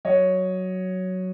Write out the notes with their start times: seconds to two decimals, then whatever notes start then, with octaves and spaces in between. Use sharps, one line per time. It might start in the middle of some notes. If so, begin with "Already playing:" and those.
0.05 F#3 C#5 D#5